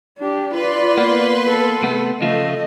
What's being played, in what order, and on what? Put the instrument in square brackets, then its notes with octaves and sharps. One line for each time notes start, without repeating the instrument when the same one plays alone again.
[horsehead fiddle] D4 G4
[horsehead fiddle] F4 D5 [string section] B4 C6
[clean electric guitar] A#3 B3
[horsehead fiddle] A4
[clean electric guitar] C3 A3 B3
[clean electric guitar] C#3 F3 F4 [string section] A3 [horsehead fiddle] D#5